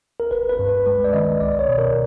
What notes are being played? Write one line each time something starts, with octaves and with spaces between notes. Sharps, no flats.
A#4
G1 B4
B4
G2
B4
G#3 B4
D5
D#3 D#5
C2 D5
C#5
B2
A#4